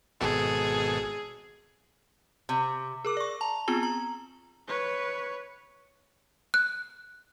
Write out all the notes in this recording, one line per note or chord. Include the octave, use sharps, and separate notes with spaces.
G#1 B2 G#4 A4
C3
G#4 A#4 D6
D5 C#6
A5 A#5
B3 C4 F4 G#4 A#5 G7
A#5
B4 C#5
F#6